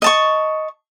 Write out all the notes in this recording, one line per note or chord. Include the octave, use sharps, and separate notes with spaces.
D#5 A5 C#6